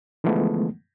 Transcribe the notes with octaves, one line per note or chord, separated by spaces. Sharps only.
D3 E3 F3 G#3 A3 B3